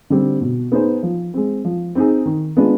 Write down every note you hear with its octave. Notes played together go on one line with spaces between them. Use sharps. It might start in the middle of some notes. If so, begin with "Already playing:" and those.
D3 G3 C4
B2
B3 D#4 G#4 C5
F3
G#3 C4
F3
C4 D#4 G#4
D#3
G#3 B3 D4 F4